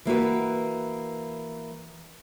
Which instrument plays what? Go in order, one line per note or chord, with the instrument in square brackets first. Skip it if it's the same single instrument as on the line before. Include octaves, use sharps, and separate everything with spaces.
[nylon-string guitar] E3 A#3 F#4 B4